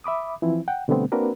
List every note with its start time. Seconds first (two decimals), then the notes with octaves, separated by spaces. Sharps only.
0.04 E5 B5 D6 D#6
0.42 E3 F3 C4 E4
0.68 F#5 G5
0.88 B2 D3 G3 A3 B3 C4
1.12 A#3 C4 D4 F#4 A#4 B4